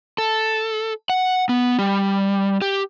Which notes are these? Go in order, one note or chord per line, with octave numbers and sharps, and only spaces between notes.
A4
F#5
B3
G3
G4